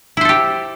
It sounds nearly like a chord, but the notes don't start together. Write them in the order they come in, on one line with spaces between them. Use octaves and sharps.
E4 C5 A4 G4